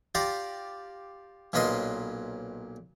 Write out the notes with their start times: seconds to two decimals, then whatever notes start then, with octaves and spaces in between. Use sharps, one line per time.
0.15 F4 G4 D5 F5 A#5
1.53 B1 A#2 C#4 B4 D#5 C6